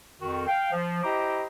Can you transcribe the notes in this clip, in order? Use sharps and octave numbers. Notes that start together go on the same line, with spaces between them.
F2 D#3 F#4
F5 G5
F3
E4 G4 C5 D#5 A#5 D6